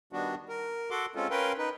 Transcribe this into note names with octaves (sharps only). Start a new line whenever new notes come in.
D#3 G3 B3 D4 F#4
A#4
F#4 A4 F#5 C6 D6
G#3 C4 C#4 F4 A4
C#4 A#4 B4 F5 G5 C6
D#4 B4